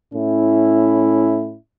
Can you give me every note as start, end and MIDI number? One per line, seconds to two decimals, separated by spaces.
0.14 1.57 45
0.14 1.57 61
0.14 1.57 64